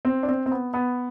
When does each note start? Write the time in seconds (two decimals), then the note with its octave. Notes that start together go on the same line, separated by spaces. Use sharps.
0.05 C4
0.23 D4
0.28 C4
0.46 C4
0.51 B3
0.74 B3